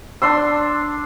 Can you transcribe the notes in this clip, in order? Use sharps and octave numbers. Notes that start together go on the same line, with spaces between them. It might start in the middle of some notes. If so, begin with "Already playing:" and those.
D4 C6 E6